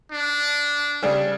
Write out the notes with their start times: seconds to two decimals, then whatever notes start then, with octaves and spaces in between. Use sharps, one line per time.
0.11 D4
1.03 C#3 G3 D4